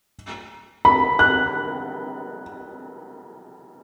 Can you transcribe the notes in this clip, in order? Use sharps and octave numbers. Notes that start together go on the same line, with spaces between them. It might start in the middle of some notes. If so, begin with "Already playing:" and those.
B5
F#6